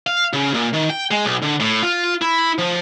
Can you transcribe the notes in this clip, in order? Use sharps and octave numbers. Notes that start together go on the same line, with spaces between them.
F5
C#3
A#2
D#3
G5
G#3
B1
D3
A2
F4
E4
F3